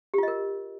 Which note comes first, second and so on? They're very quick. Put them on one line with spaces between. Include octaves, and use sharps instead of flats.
G4 F4 D#5 A#4